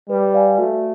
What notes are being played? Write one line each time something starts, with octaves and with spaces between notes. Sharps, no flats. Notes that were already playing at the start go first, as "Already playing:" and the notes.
G3 B4
D5 F5 G#5
A3 F#4